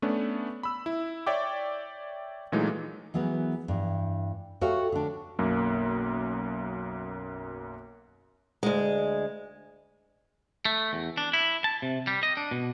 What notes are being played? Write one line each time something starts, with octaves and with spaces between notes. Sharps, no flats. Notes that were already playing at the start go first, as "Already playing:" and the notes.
A3 B3 C#4 D4
B5 E6
E4
C#5 D5 E5 G5 D6
A#2 E3 F#3 G#3 A3 D#4
E3 F#3 B3 G#4 A#4
G2 E3
F#4 G4 A4 C#5 E5 F5
D3 D4
B1 F#2 A#3
D2 G#3
A3
E2
D4
E4
A5
C3
G3
D#5
D4
B2